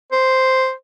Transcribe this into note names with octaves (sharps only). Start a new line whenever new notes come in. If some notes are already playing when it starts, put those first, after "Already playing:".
C5